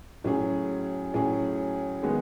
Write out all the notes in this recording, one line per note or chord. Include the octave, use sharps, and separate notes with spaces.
A2 F#3 C#4 G#4
A2 F#3 C#4 G#4
D#3 G#3 B3 D#4 G#4